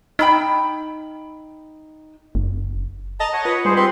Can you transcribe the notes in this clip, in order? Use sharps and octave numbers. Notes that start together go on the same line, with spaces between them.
D#4 G5 B5 E6
F#1
D#5 A5 A#5
C#5 F#5
F4 B4 C#7
G#2 G3 F4 G#4 C5
C4 B4 C6